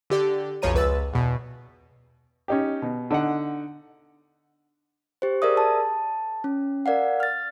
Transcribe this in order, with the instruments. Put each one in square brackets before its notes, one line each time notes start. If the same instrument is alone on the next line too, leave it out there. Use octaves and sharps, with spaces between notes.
[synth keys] D3 G4 D5
B1 F2 F3 C#5 A#5 D#7
C#2 B4 E6 A6
E2 B2
[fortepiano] C#4 D#4 G4
B2
D3 D#4 F#5
[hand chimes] G4 C5
G#4 A#4 D5 E5 D#6
A5
C#4
A#4 D5 F5 F#5
F6 A6